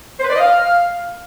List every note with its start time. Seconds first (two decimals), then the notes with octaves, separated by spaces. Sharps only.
0.19 C5
0.25 B4
0.30 D5
0.35 D#5
0.40 F5